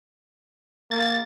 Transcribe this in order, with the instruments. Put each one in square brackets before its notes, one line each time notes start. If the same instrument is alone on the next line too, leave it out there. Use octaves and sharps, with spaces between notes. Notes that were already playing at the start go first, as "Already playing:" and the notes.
[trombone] A#3 [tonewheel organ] A6